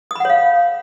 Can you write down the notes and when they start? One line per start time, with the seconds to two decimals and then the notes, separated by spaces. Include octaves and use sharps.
0.11 D#6
0.15 B5
0.20 F#5
0.25 C#5
0.30 F5